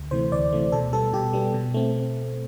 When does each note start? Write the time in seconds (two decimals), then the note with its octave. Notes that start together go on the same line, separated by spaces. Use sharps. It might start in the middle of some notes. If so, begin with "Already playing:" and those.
Already playing: D2
0.11 C3 E3 A3 C5
0.32 D2 D5
0.52 C3 E3 A3
0.72 B2 A4
0.93 G3 B3 A4
1.13 B2 G4
1.33 G3 B3
1.54 B2
1.74 A3 C4